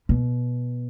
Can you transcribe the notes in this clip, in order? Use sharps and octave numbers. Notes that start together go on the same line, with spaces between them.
B2